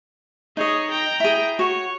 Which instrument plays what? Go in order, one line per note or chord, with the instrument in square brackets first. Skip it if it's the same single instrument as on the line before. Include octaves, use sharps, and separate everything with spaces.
[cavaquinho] D#4 D#5 [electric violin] G#4 C#5
[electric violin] G5 A#5
[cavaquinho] E4 G#4
[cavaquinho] F#4 [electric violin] C#5